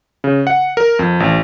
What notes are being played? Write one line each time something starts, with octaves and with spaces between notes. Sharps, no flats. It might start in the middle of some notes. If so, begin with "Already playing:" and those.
C#3
F#5
A#4
F2
A1